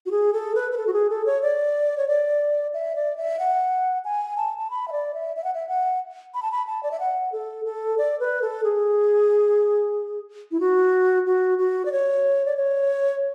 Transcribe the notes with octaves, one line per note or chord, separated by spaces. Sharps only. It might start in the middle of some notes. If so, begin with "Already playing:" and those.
F#4
G#4
A4
B4
B4
A4
F#4
G#4
A4
C#5
D5
C#5
D5
E5
D5
E5
F#5
G#5
A5
A5
B5
E5
D5
E5
E5
F#5
E5
F#5
B5
A5
B5
A5
D5
E5
F#5
A4
A4
D5
B4
A4
G#4
E4
F#4
F#4
F#4
D5
C#5
D5
C#5